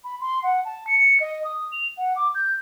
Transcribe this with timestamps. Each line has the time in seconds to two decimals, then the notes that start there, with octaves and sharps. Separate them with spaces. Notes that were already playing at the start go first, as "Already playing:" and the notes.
0.04 B5
0.21 C6
0.43 F#5
0.65 A5
0.87 C#7
1.20 D#5
1.44 D#6
1.72 F7
1.97 F#5
2.16 D6
2.35 G6